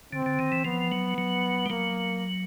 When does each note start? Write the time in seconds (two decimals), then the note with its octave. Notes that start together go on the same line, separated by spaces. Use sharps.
0.13 D3 C4
0.26 D3
0.39 D#3
0.52 E3
0.65 F3 B3
0.92 F#3
1.18 F#3
1.66 G3
1.69 F#3 A#3